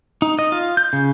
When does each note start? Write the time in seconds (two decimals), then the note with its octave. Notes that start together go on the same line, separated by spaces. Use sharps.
0.22 D#4
0.39 D#5
0.52 F4
0.77 G6
0.93 C#3